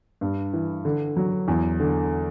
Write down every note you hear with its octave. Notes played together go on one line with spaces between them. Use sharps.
G2
E3
D3
F#3
E2
D3